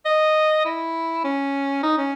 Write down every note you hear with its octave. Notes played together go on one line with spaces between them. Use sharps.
D#5
E4
C#4
D#4
C#4